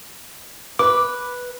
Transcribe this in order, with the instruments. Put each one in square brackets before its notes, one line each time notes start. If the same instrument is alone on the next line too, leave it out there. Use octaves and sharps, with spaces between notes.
[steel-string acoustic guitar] B4 [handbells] D6